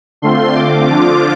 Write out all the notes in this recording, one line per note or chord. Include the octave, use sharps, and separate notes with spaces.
D3 A3 C4 F4 C6
D3 A3 C4 F4 D6
D3 F3 D4 F4